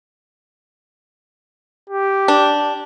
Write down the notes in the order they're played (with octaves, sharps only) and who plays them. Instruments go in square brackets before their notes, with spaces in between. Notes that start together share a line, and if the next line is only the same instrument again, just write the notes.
[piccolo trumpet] G4
[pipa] D4